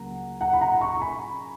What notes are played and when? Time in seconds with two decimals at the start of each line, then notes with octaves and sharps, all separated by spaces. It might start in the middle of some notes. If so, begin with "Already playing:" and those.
Already playing: C#2 C#3 F#3 A#3 F#5 A#5
0.41 F#5 A#5
0.53 B5
0.61 F#5 A#5
0.81 A#5 C#6
0.97 C#6
1.02 G#5 B5